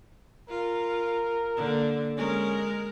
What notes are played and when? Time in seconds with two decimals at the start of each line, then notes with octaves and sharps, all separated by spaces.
0.49 F4 A#4
1.57 D3 A#3
2.17 G#3 C#4 A#4